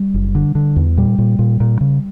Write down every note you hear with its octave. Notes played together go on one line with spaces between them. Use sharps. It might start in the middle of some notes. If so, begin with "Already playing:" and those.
Already playing: G3
F#1
D3
D3
E2
A#2 G3
A#2
A#2
A#2
C#3